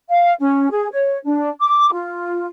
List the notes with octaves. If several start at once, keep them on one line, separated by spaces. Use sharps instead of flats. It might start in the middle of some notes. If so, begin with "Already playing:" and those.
F5
C#4
G#4
C#5
D4
D6
F4